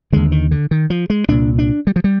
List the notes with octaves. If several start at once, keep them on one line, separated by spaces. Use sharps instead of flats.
D#2 D3 G#3
D#3
D3
D#3
F3
G#3
C2 A#2 D4
D4
G3
F3
G3